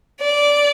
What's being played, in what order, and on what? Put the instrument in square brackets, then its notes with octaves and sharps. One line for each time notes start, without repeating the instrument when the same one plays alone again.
[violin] D5